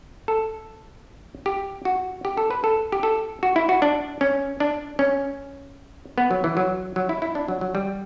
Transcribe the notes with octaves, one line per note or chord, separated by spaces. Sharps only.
A4
G4
F#4
G4
A4
B4
A4
G4
A4
F#4
E4
F#4
D4
C#4
D4
C#4
B3
F#3
E3
F#3
F#3
E4
E4
D4
F#3
F#3
G3